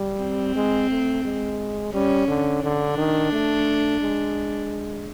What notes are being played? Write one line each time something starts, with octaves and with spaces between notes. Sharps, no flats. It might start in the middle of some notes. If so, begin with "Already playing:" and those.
Already playing: G3
C4
G#3
A3
G#3
G3 C#4
D3
D3 D4
D#3
A3
G#3